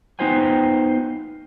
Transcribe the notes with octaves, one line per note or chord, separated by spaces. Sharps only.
B3 D#4 F4 C5 G5 G#5